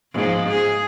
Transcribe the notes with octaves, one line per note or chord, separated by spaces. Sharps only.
G#2 F3
G#4